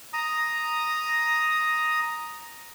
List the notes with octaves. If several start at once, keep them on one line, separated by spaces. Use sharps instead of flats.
A#5 D#6